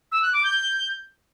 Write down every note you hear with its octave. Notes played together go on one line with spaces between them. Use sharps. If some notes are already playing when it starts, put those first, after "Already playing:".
E6
F#6
D6
G6